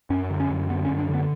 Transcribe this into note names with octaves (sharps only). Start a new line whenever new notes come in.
F#2 C#4
D3
C#4
F#2
D3 B3
C#4
F#2
D4
D3
B3